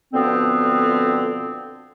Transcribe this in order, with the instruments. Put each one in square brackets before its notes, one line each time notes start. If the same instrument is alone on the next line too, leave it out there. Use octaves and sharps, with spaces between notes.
[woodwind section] B2 D3 F3 B3 C4